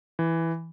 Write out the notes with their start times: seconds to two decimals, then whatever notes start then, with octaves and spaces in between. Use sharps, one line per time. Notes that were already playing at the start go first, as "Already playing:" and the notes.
0.19 E3